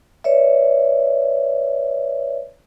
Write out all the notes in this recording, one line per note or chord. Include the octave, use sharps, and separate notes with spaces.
B4 C#5 D5 E5